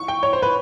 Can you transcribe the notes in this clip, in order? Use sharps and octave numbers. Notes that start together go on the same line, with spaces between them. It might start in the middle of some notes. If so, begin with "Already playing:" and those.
Already playing: C#6
G5
C#5
C5
B4